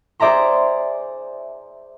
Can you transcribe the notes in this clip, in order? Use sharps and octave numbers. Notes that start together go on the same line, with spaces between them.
G#4 C5 D5 E5 A#5 C6